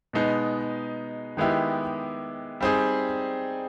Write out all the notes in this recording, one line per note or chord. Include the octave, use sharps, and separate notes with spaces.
B2 G#3 B3 D#4
D#3 G#3 B3 E4 G4
G3 C4 D#4 G#4